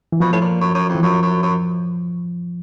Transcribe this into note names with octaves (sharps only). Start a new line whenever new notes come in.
E3
B2 F3
A2
A#2
F#2
F#2
F2
E3
F#2 F3
F#2
F#2